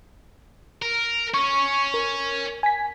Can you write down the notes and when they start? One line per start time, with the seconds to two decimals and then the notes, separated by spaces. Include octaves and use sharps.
0.82 A#4
1.34 C#4 C#6
1.94 A#4
2.63 G#5 B6